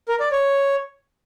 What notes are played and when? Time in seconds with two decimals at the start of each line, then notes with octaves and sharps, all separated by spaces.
0.08 A#4
0.20 D5
0.32 C#5